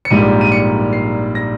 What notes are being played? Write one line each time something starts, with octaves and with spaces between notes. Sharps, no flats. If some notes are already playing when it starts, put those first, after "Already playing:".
C#7
A#1 G#2 G3 A#3 D#7
D#7
C#7
C7
A#6